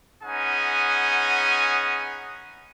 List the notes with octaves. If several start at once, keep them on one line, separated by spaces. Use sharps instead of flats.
B3 C#4 D#4 G#4 F#5 G#5